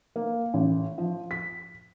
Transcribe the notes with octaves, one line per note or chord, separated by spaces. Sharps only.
A#3
A1
F3
B6